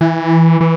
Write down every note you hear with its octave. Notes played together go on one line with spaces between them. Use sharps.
E3
E3